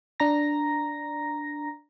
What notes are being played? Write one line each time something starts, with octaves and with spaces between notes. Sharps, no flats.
D4 A#5 A#6